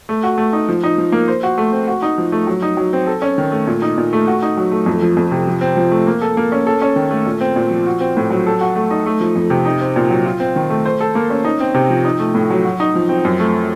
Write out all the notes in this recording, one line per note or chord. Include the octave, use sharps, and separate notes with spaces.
A3
F#4
A3
D#4
F3
D#4
F3
A#3
C5
F#4
A3
C4
F#4
D#4
F3
A3
F#3
D#4
F#3
C4
A4
C#4
D#3
A3
A#2
D#4
A#2
A3
F#4
D#4
F#3
A3
F2
F3
F2
C3
F3
C4
F3
A3
A#3
A4
A#3
C#4
A4
C#4
D#3
A3
A#2
C4
A#2
F3
F#4
C4
A2
F#3
A4
F#4
A3
D#4
A3
F3
F2
C3
D#4
C4
A#2
F#3
F4
C4
D#3
A3
C5
A4
A#3
C#4
D#4
C4
C3
F3
D#4
A3
A2
F#3
F#4
D#4
F3
C4
F#2
A3